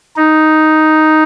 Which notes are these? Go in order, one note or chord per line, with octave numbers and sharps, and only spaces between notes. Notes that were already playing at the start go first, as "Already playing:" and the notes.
D#4